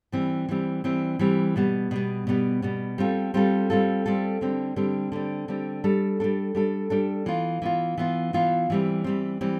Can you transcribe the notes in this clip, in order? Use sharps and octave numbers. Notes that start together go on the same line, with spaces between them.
E3 G3 C4
E3 G3 C4
E3 G3 C4
E3 G3 C4
B2 G3 B3
B2 G3 B3
B2 G3 B3
B2 G3 B3
G3 C4 F4 A4
G3 C4 F4 A4
G3 C4 F4 A4
G3 C4 F4 A4
D3 G3 C4
D3 G3 C4
D3 G3 C4
D3 G3 C4
G3 D4 A4
G3 D4 A4
G3 D4 A4
G3 D4 A4
E3 B3 F4
E3 B3 F4
E3 B3 F4
E3 B3 F4
E3 G3 C4
E3 G3 C4
E3 G3 C4